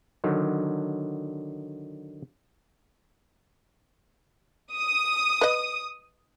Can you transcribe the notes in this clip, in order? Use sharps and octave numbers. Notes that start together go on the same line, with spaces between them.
D3 D#3 F#3
D#6
B4 D#5